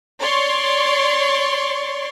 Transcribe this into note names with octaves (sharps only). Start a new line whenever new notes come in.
C#5 D5 C6 C#6